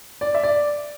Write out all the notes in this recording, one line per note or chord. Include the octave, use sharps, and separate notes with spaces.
D5
E5
D5